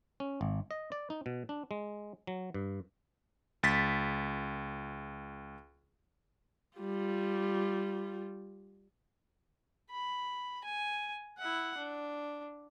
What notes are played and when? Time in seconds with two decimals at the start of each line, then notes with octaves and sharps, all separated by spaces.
0.20 C#4
0.41 G#1
0.71 D#5
0.92 D5
1.10 D#4
1.26 B2
1.49 D4
1.71 G#3
2.27 F#3
2.54 G2
3.63 C#2 A6 B6
6.78 G3 F4
9.91 B5
10.65 G#5
11.38 E4 F#5
11.77 D4